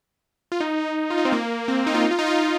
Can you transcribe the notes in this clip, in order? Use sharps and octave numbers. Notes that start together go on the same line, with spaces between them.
F4
D#4
F4
D#4
C4
A#3
A#3
C4
D#4
F4
D#4
F4
D#4
F4
D#4
F4